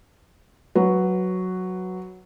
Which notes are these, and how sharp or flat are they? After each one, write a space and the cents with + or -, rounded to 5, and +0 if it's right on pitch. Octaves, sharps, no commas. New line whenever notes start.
F#3 +0 B4 +0